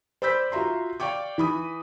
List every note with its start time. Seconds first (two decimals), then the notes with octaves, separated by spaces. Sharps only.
0.22 C5 D5 B5 E6 G6 B6
0.52 F4 F#4 E5 A#5 C6
1.00 D5 F5 G5 C#6 D6
1.38 E3 B5 D#6